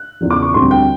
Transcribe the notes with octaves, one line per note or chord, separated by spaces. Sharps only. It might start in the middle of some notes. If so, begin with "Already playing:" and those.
Already playing: F#6
E2 C#3 F3
D6
C#6
D2 D3 G3 C4 C6
G5